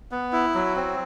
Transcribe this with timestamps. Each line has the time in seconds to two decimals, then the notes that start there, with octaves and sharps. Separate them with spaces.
0.11 B3
0.32 E4
0.54 F#3
0.76 C4